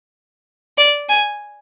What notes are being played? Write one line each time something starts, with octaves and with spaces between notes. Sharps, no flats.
D5
G#5